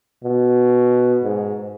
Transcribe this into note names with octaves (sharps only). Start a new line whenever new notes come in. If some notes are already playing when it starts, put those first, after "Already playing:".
B2
G#2